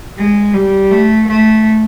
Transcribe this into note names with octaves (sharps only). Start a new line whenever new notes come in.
G#3
G3
A3
A3